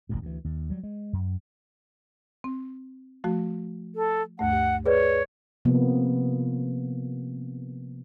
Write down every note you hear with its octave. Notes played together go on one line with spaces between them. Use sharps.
E1 A1 D2 G2
D2 E3
D#2
F#3 G3
G#3
F#2
C4
F3 A3 F#4
A4
D2 G2 A3 F#5
G4
G#4 B4 C#5 D5
C3 F3 A#3 B3